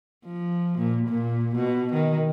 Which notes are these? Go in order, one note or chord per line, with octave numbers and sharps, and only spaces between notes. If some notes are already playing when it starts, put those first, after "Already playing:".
F3
A#2
A#2
B2
D#3